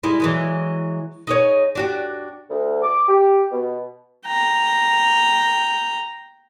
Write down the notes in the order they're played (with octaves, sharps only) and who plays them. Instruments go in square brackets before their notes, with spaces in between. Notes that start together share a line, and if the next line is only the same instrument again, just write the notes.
[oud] G3 G#3 E4
E3 F#3 G#3
D#4 G#4 C#5
D4 F#4 G4
[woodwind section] D2
D6
G4
B2
[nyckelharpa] G5 A#5